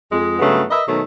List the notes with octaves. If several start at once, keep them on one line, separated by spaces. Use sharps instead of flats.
F2 G#3
G2 C#3 F#3 A3 B3
A#4 B4 D#5 E5
B2 D#3 F#3 A3